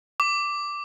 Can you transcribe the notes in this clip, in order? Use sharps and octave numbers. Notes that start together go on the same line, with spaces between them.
D6